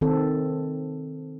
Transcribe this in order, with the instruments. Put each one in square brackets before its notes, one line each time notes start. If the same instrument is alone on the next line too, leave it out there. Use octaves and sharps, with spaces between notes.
[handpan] D#3 C4 A4